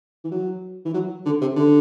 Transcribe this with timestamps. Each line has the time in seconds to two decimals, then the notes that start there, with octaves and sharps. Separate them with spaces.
0.24 E3
0.31 F#3
0.85 E3
0.94 F#3
1.26 D3
1.41 C3
1.56 D3